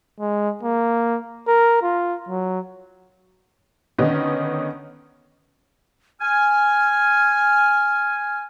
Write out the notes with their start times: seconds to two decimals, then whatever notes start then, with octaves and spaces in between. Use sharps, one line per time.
0.20 G#3
0.63 A#3
1.48 A#4
1.82 F4
2.29 F#3
3.98 D3 D#3 B3 C#4 D#5
6.21 G#5 F6